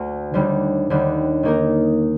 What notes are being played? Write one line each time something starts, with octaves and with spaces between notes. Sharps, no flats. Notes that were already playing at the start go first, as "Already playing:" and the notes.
Already playing: D2 D3 A3
D#2 D3 G3 D4
D#2 D3 G3 D4
D#3 A#3 D#4 A#4